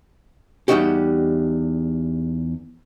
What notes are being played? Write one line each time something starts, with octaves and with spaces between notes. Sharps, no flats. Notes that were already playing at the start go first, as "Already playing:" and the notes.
E2 E3 G3 D#4 F#4 G4